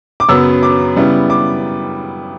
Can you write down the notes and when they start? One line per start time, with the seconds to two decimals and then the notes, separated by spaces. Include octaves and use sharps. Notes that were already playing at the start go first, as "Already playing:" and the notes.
0.20 D6
0.29 F#2 C#3 F#3 B3 E6
0.63 D6
0.96 C#3 G3 B3 E4
1.30 D6